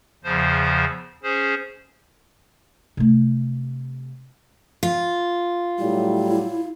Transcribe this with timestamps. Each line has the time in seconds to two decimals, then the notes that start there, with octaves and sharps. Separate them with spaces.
0.24 E2 C#3 F3 C5
1.23 C#4 G#4 C5
2.97 C3 A3
4.83 F4
5.79 A2 F#3 G3 E4